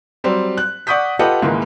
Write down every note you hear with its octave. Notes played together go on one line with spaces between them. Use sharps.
F#3 G3 C4
F#6
D5 F#5 C#6 D#6 G6 B6
F4 G4 A4 B4 D#5 F#5
C#2 G#2 D#3 E3 G#3 A#3